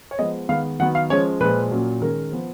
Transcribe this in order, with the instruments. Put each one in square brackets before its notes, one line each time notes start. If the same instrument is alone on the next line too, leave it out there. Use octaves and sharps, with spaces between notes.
[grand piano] C#5
F3 G#3 B3 D#5
D#3 G#3 B3 F5
D#3 F#3 B3 F#5
F5
F3 G#3 C#4 C#5
A#2 F3 G#3 B4
A#2 F#3 A#3 C#4
D#3 G#3 C#4 A#4
F3 B3